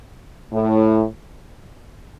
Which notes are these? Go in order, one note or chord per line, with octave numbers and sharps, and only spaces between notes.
A2